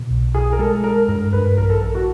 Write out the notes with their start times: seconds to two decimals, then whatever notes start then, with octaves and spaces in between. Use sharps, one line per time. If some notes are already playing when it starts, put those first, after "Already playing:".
Already playing: B2
0.10 B1
0.34 B1 G#4
0.52 A#4
0.59 G#3 A4
0.83 G#3 A#4
1.08 G2 A#4
1.33 G2 B4
1.57 A#1 A#4
1.70 A4
1.82 A#1
1.95 F#4